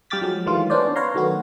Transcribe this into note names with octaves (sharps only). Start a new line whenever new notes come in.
G3 G4 F5 D6 A6 B6
F3 F#3 G#3
D#3 E3 F#3 G#3 A3 F4
B3 C#4 D4 C5 D5
B4 C#5 F5 A#5 C6
D#3 F#3 A3 B3 F#4